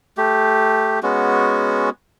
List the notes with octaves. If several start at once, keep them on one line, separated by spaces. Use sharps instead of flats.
A3 G4
G#3 B3 C#4 F#4